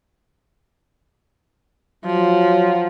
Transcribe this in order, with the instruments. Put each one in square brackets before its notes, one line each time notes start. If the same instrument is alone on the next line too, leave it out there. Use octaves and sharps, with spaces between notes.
[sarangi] F3 [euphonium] F#3